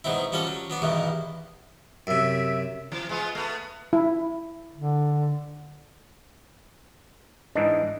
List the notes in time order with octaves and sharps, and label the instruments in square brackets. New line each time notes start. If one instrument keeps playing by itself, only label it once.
[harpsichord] G#2 B2 F#3 C4 E4
F3 G3 C#4 F#4 A4
F#3
F#3 B3 D5
E2 G2 B2 D#3 E3
[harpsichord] F#2 C3 [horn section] E5
[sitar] E3
G#3 B3 F4
A3 B3
[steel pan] E4
[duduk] D3
[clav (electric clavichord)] G#2 E3 D4 [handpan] D#5